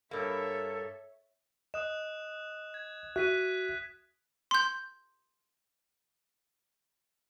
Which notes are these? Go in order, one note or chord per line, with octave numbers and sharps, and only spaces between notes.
G2 A#3 A4 C#5 E5
D#5 D#6 F#6 E7
G#6
F#4 E5 F#6 B6 D#7
C6 G6